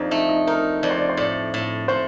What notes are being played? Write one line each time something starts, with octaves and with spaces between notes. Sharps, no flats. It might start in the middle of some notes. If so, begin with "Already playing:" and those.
Already playing: F2 D4 D#4
A3 D#4
D#4
D#4 A#4
F2 D5
C5
D5
C5
A2 D5
A2
A2 C5